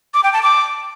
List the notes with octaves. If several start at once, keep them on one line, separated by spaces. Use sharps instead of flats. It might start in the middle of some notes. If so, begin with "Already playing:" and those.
D6
G5
A5
D6